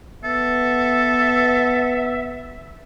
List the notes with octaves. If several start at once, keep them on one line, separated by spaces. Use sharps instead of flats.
B3 A4 E5